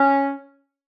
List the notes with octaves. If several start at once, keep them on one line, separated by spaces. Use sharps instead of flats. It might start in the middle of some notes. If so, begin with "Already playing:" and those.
Already playing: C#4